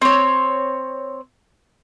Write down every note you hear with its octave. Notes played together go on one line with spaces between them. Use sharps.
C4 C#5